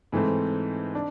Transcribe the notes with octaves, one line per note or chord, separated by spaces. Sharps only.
G#2 E3 A3 C4
D4